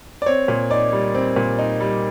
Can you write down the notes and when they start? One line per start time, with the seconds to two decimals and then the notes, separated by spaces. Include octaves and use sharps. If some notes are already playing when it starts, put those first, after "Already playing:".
0.22 D5
0.26 C4 C#5
0.48 A#2
0.70 D#4 D5
0.93 G3
1.14 C4
1.36 A#2
1.59 D#4
1.80 G3